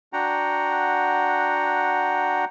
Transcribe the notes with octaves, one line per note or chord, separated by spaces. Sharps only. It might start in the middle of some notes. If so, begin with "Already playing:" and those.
D4 F#4 F#5 G5 A#5